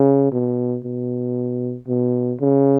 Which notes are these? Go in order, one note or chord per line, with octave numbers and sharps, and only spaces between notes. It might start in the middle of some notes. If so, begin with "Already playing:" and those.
Already playing: C#3
B2
B2
B2
C#3